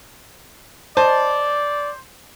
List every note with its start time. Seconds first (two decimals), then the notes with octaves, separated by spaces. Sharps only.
0.97 C5 D5 D#5 A5